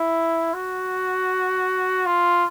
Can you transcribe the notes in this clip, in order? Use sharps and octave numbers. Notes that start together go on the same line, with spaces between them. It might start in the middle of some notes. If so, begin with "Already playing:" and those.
Already playing: E4
F#4
F4